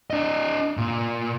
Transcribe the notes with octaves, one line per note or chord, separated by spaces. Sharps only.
D4 D#5
A#2